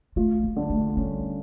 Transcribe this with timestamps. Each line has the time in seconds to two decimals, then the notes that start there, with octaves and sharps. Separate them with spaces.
0.16 A3 F4
0.43 A#3
0.56 D3
0.70 A3
0.96 G3 C#4